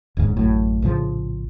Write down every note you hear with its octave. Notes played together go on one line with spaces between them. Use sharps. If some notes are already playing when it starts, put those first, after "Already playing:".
D#1 D2 G#2 C#3
A1 F#2 A2
A#1 A2 C#3 F3